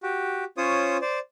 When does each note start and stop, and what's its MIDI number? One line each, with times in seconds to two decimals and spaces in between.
0.03 0.44 66
0.03 0.44 67
0.57 0.97 61
0.57 0.97 65
0.57 0.97 72
0.57 0.97 73
0.57 0.97 87
1.02 1.19 72
1.02 1.19 74